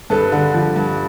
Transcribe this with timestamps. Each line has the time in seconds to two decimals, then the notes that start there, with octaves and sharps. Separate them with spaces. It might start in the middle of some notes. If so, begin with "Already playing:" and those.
0.10 G2 A4 B4
0.32 D3
0.54 F3
0.76 G2